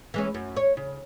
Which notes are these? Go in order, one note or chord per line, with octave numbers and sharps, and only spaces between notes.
E3 G#3 C#4
F#2
C#5
C#3